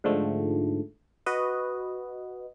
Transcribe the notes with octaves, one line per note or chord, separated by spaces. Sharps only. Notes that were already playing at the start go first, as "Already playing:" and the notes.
G#2 D3 F3 A3
F#4 B4 D#5